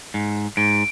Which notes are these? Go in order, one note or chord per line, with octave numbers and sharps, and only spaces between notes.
G#2
G#2 D7